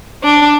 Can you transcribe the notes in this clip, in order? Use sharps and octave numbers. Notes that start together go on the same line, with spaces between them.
D4